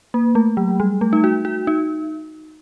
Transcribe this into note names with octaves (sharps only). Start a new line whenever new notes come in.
A#3
A3
F#3
G3
A3
D#4
F#4
F#4
D#4